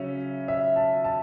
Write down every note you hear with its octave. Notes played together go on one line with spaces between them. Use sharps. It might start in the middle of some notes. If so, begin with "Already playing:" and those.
Already playing: C#3 F#3 C#4 E5
E5
A5
A5